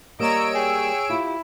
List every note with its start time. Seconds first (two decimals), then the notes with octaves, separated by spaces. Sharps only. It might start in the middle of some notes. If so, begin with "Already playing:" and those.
0.20 G3 A#3 C#5 D#5 A#5 E6 D7
0.55 G#4 G5
1.10 E4 F4 G4